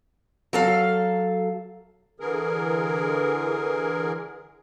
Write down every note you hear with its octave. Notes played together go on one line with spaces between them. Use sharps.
F#3 A4 F5
D3 E3 G#4 A#4